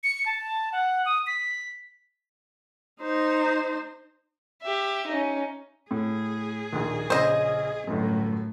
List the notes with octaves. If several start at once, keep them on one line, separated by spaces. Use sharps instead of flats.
C#7
A5
F#5
D#6
B6
D#4 C5
G4 E5
C#4 D#4
A2 G#4
A#1 D#2
A#1 C#3 C5 D#5
G1 F#2 A2